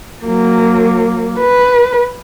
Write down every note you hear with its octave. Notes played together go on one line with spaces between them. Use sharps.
F#3 A#3
B4